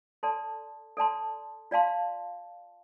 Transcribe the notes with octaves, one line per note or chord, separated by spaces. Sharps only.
A4 D5 A5 C6
A4 D5 A5 C6
F4 D5 F5 A5 C6